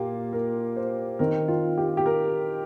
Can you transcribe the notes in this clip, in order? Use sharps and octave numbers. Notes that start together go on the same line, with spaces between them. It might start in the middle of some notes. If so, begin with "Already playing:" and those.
Already playing: A#2 A#3 F4 G4
A#4
C5
D#3 C4 A#4
F4
G4
G4
A#4